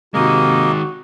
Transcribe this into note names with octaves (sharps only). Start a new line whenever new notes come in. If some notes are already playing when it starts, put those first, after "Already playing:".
C3 D#3 G#3 A#3 F#4 D#5